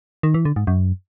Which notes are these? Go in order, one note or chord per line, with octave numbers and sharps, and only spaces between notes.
D#3
E3
D3
G#2
F#2